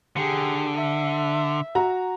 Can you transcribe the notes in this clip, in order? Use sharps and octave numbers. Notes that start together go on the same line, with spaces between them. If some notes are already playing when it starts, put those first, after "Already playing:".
D3 G4 G#4
E5
F#4 A#5